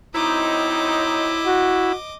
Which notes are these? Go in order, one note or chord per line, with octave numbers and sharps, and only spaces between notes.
F#3 C4 D#4 E4 D#5 D6
F#4